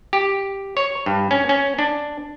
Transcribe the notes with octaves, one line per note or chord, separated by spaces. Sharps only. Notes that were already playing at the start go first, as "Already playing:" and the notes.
G4
C#5
G2
C#4
C#4
D4